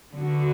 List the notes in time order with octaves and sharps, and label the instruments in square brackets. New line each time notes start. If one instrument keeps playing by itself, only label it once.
[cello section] D3 B3 F#4